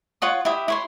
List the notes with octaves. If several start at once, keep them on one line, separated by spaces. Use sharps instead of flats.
F4 C#5 F#5 D#6
E4 G4 E5 D#6
E4 C#5 C6